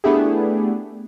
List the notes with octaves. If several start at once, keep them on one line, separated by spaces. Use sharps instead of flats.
A3 B3 D4 E4 G4 G#4